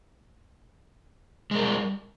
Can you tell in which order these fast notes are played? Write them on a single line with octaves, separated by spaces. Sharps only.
G#3 A#4 G3